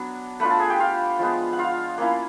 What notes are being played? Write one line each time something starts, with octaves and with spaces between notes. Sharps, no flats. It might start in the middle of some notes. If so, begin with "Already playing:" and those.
Already playing: F#3 B3 D4
A3 D4 F4 B4 B5
A4 A5
G#4 G#5
G4 G5
F4 F5
F3 G#3 B3
F#5
F4 F5
A#3 C#4 E4